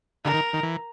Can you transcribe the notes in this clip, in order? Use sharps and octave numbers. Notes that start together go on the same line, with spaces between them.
D3 A#4
D#3
D#3
E3